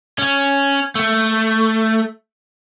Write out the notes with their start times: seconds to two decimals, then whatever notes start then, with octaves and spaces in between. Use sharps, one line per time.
0.18 C#4
0.95 A3